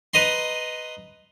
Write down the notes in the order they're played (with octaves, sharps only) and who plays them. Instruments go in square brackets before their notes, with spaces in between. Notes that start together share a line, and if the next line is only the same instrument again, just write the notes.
[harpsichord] B4 D#5 A#5 C6